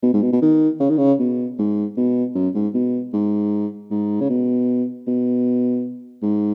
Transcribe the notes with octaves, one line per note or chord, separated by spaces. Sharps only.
B2
G#2
B2
B2
D#3
C#3
D#3
C#3
B2
G#2
B2
F#2
G#2
B2
G#2
G#2
C#3
B2
B2
G#2